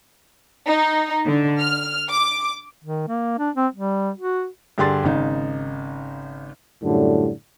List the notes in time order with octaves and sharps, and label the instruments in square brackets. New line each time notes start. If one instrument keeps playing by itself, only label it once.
[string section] D#4
D3
F6
D6
[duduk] D#3
A#3
D4
C4
G3
F#4
[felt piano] G2 D3 G4 G#4 C6 A6
G#1 C#3 D#4
[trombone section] F#2 A2 D3 G3